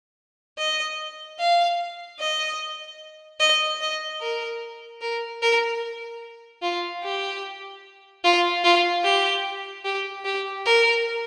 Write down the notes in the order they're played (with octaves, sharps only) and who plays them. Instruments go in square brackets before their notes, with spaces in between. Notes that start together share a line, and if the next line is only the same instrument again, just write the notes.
[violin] D#5
F5
D#5
D#5
D#5
A#4
A#4
A#4
F4
G4
F4
F4
G4
G4
G4
A#4